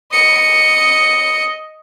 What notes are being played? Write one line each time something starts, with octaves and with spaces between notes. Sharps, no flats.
D#5 C#7